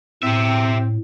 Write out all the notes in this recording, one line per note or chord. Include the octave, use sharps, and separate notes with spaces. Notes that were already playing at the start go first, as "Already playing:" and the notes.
A2 C4 G4 E5